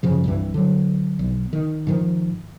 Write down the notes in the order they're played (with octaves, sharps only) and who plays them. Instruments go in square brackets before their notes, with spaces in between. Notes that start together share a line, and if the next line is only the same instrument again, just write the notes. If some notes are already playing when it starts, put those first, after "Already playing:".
[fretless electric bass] F#2 C#3 F3
C2 G2 E3
D3 F#3
B1
D#3
G#2 D#3 F3